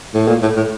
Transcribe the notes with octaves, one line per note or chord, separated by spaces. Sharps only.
A2
A#2
A2
A2